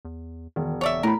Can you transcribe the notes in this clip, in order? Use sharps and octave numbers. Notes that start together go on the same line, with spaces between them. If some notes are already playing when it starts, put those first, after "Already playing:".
E2
E1 D#3
F#1 C#5 D5 E5
A2 A#4 A#5 B5